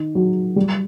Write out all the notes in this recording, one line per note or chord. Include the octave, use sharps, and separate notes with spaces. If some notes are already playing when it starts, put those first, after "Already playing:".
Already playing: D#3
F#3
G3